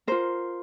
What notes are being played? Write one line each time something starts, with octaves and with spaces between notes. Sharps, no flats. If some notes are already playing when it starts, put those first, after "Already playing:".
F4 A#4 C5